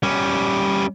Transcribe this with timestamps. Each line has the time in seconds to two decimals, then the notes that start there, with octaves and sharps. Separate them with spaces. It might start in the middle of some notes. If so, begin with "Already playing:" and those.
0.03 G3 C#4